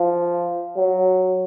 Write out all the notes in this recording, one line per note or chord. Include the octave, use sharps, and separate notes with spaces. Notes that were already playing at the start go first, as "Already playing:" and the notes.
Already playing: F3
F#3